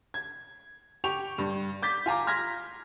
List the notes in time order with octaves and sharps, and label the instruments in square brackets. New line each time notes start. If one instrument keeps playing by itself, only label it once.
[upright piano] G#6
G4 G5 C#6 F7
G2
D6 G6 A6 B6
F4 G#5 A#5 D6
C6 F6 G#6 A#6 B6